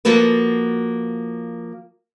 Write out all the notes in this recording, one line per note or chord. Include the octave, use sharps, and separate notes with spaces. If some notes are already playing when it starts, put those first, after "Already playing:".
F3 A#3 F#4 A4 B4